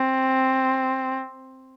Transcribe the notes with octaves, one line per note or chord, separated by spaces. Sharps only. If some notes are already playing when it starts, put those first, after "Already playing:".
Already playing: C4